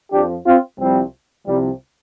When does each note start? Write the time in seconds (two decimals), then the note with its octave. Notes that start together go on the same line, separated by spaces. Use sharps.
0.11 F2 F3 D4 G4
0.45 C4 F4
0.79 C2 C3 F3 G3 C4
1.46 C2 C3 F3 G3